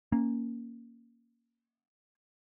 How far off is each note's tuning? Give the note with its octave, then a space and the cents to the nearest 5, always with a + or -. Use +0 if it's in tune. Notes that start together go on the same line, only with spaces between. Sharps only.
A#3 +0 C#4 +0